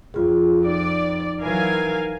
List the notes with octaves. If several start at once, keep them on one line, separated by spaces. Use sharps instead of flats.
F2 F4 G#4
D#4 D5
E3 F#3 A#4 F5 G#5